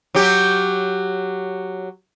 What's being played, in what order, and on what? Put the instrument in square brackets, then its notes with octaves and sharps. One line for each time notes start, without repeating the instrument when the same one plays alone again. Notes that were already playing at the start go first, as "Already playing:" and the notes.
[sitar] F#3 G4